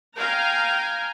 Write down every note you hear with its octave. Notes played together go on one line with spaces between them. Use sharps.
F5 G5 G#5 A#5